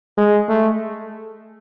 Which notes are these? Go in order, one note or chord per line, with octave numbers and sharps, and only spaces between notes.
G#3
A3